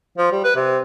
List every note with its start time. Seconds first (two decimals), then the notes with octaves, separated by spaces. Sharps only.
0.18 F3
0.32 G3
0.44 B4
0.56 C3